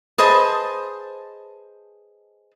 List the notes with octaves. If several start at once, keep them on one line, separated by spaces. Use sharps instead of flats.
G#4 B4 C5 D#5 A5